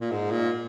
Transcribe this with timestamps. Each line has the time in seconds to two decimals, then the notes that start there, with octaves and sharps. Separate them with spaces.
0.01 A#2
0.11 G#2
0.31 A#2